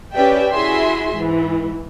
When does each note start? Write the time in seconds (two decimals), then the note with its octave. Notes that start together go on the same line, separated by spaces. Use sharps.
0.13 C#4 G4 B4 D5 E5 G5
0.51 E4 F#4 G#4 E5 C6
1.16 G#2 E3